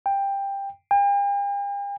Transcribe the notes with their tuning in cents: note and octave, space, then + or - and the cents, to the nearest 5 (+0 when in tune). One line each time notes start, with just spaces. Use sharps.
G5 +15
G5 +45